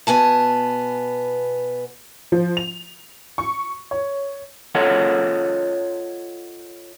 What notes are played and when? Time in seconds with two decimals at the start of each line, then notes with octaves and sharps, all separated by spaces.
0.07 B2 B3 G#5 A5
2.32 F3
2.57 F7
3.38 C#6
3.91 C#5
4.75 F4 A4 C#5 D#5 F#5